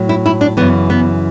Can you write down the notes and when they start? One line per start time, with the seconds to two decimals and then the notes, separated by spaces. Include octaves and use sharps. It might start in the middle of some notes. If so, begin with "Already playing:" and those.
Already playing: A2 F#3
0.09 E4
0.26 E4
0.41 D4
0.57 F#2 C#3 E3 B3
0.90 B3